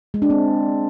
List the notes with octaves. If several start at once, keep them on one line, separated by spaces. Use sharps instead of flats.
G#3
D4
C4